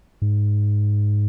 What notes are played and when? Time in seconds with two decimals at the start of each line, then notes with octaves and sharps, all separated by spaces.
0.22 G#2